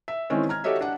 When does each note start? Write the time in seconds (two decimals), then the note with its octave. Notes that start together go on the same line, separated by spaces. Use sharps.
0.08 E5
0.30 D#3 E3 G#3 C4 C#4
0.49 A#5 F6 G#6
0.64 F#4 G4 A4 C#5 D#5 E5
0.81 D4 F#5